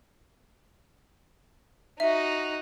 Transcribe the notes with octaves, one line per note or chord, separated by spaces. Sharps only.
D#4 F#4 E5